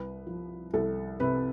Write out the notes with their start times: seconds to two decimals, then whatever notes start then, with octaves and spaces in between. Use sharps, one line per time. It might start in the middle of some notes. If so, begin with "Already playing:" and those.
Already playing: C2 B4
0.27 F3
0.74 C2 A4
1.20 C3 B4